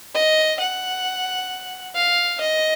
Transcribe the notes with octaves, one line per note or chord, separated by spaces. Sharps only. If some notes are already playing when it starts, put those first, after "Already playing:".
D#5
F#5
F5
D#5